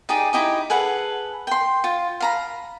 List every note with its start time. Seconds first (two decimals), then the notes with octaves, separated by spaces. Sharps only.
0.09 D#4 G4 G#4 D5
0.33 D#4 E4 G4 D#5
0.70 G#4 A4 B4 F#5
1.47 G5 C6
1.84 F4
2.20 F5 A#5 B5